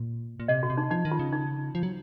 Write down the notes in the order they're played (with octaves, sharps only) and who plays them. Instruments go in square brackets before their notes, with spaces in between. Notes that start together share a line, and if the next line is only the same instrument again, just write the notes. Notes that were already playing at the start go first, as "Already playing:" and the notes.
Already playing: [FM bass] A#2
A#2
[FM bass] C3 [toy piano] D#5
[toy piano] F#4
[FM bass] C3
[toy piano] D#4
[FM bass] F3 [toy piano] D#4
[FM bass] D#3
[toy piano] F4
[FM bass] C#3
[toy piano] D#4
[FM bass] F3
F#3